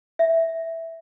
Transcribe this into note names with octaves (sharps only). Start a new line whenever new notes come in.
E5